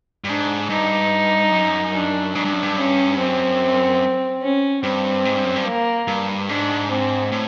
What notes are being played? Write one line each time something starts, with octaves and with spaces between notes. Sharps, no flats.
G2
G#2 D4
G2 D#4
F#2
D4
G#2 D4
G2
F#2
G2
C#4
F#2 C4
C#4
G2 C4
G#2
G2
F#2
G2
A#3
G2
G#2 D4
C4
A2